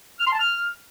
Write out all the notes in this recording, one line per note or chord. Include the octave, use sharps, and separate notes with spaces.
F6
C6
A5
F6